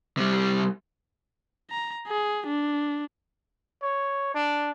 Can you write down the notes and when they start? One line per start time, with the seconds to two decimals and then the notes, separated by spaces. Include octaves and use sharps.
0.17 C3 G3
1.70 A#5
2.08 G#4
2.47 D4
3.83 C#5
4.34 D4